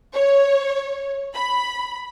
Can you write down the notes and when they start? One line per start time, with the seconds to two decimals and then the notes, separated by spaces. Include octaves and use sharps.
0.14 C#5
1.35 B5